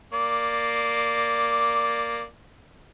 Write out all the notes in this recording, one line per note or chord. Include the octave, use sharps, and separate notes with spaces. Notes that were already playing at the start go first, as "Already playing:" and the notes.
A#3 D5